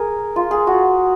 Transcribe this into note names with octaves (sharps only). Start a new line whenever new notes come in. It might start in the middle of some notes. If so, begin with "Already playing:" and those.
Already playing: G#4 A#4
F4
G#4
F#4